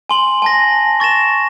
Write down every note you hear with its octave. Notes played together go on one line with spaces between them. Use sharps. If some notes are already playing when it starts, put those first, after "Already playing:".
G#5 C6 F#7
G#5 A5 A#6
C#6 A6 A#6 E7